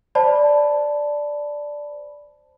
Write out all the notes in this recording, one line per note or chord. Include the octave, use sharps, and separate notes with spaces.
C5 D5 A5 B5